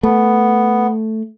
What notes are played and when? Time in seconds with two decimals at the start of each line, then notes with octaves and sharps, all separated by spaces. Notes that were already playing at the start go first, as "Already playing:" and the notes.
0.03 A3 B3